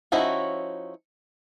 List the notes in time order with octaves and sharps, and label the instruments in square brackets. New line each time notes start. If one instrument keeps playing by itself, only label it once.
[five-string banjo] F3 C#4 D#4 E4 F#4